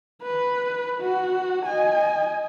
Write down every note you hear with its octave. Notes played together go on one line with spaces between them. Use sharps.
B4
F#4
D#5 G#5